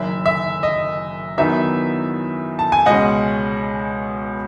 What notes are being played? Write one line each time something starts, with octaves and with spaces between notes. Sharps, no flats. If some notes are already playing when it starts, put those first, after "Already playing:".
Already playing: F#1 F#2 D#3 E5
E5
D#5
E2 D#3 F#3 B3 D#4 E5
A5
G#5
C#2 B2 G#3 C#4 D#5 F#5